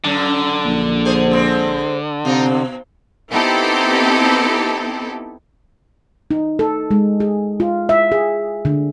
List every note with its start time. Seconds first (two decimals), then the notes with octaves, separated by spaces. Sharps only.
0.04 F#2 D3
0.64 A#1
1.05 G#4 C5
1.31 G#3 C4
2.25 C3 C4 D#4 F4
2.46 B2
3.31 B3 C4 D#4 E4 G4 A4
6.31 D#4
6.59 A4
6.91 G#3
7.20 G#4
7.60 F4
7.89 E5
8.12 G#4
8.65 D3